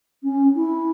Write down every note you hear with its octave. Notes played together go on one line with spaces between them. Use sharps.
C#4
E4